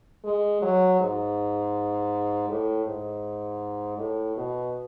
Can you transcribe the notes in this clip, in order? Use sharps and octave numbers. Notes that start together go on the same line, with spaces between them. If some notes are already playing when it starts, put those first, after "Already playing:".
G#3
F#3
G#2
A2
G#2
A2
B2